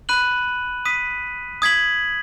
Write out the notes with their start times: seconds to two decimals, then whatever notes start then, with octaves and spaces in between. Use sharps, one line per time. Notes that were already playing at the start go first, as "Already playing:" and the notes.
0.09 B5 F#6 D#7 F#7
0.85 D#6 B6 D#7
1.62 D#6 G#6 B6 F#7